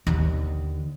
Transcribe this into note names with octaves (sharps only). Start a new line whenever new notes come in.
D#2 D3